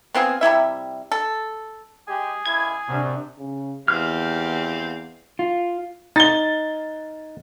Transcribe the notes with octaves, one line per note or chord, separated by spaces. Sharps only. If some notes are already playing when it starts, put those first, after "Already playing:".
B3 C4 F4 G#4
C3 G3 E4 E5
A4
G#3 G4 G#4 G#5
C#2 A#2 E4 G#6
F#2 C3 D4
C#3
E2 C4 G4 F5 F6
F4
D#4 A6 G7